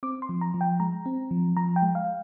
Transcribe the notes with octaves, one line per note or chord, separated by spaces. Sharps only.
C4 D6
C6
F3
A#5
F3
G5
G#3 A#5
C4
F3
F3 A#5
G5
G#3
F5